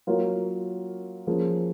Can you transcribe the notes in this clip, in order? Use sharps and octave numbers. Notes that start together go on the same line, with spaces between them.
F#3 A#3 F4 A#4 C#5
F3 A#3 C#4 G#4